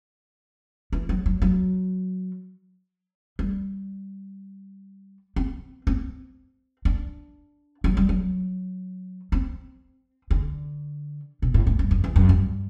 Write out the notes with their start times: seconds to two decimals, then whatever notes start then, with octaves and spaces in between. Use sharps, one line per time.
0.93 E3
1.09 F#3
1.26 F#3
1.42 F#3
3.39 G3
5.36 C4
5.87 C4
6.85 D4
7.84 F#3
7.97 G3
8.09 F#3
9.32 C4
10.31 D3
11.42 B2
11.54 A2
11.67 A2
11.79 G2
11.91 F#2
12.04 E2
12.16 F#2
12.29 G2